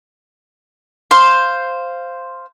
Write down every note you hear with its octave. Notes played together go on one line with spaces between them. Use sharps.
C5 F5